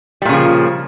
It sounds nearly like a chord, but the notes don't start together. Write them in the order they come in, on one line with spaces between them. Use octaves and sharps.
G3 A#2 C#3 F3